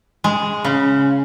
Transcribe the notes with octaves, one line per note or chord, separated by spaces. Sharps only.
G#3
C#3